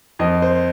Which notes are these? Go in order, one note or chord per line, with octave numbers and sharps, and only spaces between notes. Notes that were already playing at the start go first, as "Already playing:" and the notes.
F2 D#5
C5